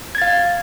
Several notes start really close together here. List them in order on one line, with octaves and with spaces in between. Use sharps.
G#6 A6 F5